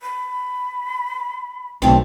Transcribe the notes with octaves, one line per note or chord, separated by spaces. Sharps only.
B5
B1 D3 A3 C4